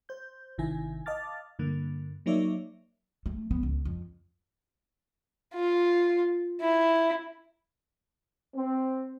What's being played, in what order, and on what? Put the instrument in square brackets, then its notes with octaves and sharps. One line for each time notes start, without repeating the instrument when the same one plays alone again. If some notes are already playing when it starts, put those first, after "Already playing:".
[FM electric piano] C5 G6
G#1 C3 D#3 E4 G#5
D#5 F5 A5 D6 F6 A6
G2 D3 A#3
F#3 A#3 D#4 C#5 D5 E5
[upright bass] A3
B3
C#2
F2
[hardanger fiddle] F4
E4
[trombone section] C4